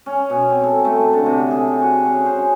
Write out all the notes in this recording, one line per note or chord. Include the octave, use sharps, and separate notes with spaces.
C#4
B2
C4
A4
A3
D3
C3
G#4
F#4
C#4
C5